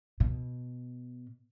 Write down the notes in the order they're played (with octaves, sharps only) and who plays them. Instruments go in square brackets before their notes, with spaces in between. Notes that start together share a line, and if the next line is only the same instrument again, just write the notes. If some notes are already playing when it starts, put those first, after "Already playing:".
[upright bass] B2